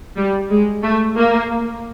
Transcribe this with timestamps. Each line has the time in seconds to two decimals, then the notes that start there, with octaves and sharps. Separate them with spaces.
0.16 G3
0.50 G#3
0.83 A3
1.17 A#3